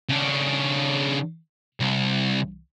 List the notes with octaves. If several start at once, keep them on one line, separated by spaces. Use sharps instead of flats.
C#3 D4
C2